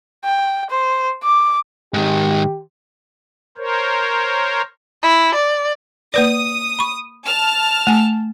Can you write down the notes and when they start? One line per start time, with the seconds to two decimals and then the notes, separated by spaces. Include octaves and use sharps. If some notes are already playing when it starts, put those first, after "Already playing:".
0.25 G5
0.71 C5
1.24 D6
1.94 G#2 D#3 G4
3.57 A#4 C5 C#5
5.03 E4
5.35 D5
6.14 A#3 B4 D5 D#6
6.79 B5 C#6
7.25 A5 F6
7.87 A3 G#5